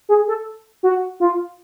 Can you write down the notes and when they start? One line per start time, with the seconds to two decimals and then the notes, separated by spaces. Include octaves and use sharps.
0.09 G#4
0.28 A4
0.83 F#4
1.20 F4